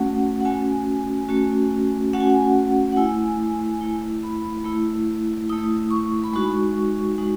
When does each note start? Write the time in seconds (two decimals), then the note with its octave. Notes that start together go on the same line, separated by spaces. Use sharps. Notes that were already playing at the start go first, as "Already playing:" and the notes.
Already playing: A3 C#4 F#4 F#5
0.41 F#5
0.45 A3 C#4 F#4 G#5
1.29 A3 C#4 F#4
2.13 A3 C#4 F#4 F#5
2.20 G#5
2.30 F#5
2.92 F#5
2.96 A3 E4 G#5
3.81 A3 E4
4.23 B5
4.64 A3 E4
5.49 A3 E4 D#6
5.91 C#6
6.24 B5
6.33 G#3 D#4 F#4 C#6
7.17 G#3 D#4 F#4